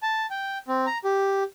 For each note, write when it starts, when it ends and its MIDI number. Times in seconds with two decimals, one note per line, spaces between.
0.03 0.26 81
0.30 0.58 79
0.68 0.86 60
0.86 0.98 82
1.04 1.43 67